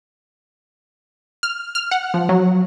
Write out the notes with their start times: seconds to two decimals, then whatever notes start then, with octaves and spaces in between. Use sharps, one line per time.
1.43 F6
1.75 F6
1.91 F#5
2.14 F3
2.29 F#3